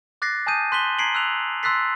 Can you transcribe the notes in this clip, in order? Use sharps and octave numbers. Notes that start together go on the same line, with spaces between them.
D6 F#6 A6 A#6 C7
G#5 A5 D#6 G6 D#7
C6 F#6 B6 E7 F#7 G7
A#5 G#6 B6 C7 D7 F#7
E6 F#6 F7
C6 E6 F#6 A6 B6 C7